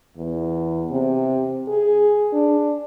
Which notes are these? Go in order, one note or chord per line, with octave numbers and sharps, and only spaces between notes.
E2
C3
G#4
D4